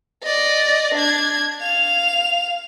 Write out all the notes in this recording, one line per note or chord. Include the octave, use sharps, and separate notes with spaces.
D5 D#5
D4 G#6
F5 F7